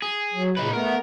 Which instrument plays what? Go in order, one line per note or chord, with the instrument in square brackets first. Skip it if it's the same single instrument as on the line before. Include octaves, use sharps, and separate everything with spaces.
[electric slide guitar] G#4
[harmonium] F#3
[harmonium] A#2 C#3 [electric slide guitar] D#4 B4
[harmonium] A3 B3 [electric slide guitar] A#4